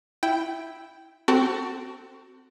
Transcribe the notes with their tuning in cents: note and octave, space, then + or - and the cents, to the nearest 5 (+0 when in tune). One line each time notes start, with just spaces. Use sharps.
E4 +0 G5 +0
C4 -5 F#4 +20 A4 +25